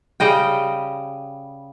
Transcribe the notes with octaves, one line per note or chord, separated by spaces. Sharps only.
C#3 G3 D#5 G5